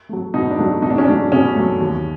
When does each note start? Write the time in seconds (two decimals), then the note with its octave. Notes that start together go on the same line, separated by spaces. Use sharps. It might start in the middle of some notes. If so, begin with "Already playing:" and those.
0.09 F#3 A3
0.34 B2 D#4
0.50 D4
0.58 F#3 A3
0.82 B2 D#4
0.90 D4
0.98 C#4
1.04 F#3 A3 D4
1.32 B2 C#4
1.56 F#3 A3
1.80 D#2